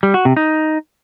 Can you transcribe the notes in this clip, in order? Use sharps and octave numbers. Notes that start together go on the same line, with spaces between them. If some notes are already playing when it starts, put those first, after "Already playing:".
G3
F#4
C3
D#4